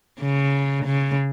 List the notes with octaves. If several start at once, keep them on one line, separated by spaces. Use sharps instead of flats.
C#3
C#3